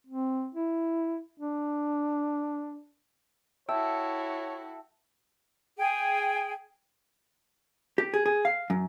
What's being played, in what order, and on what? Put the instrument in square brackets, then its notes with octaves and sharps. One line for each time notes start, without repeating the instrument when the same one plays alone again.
[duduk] C4
E4
D4
[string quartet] E4 F#4 A4 [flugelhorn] C#5 [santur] E5 [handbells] G5 A5 E6
[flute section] G#4 G5
[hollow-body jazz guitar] G4
G#4
G#4
F5
F#2